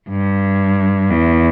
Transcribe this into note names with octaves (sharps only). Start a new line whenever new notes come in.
G2
E2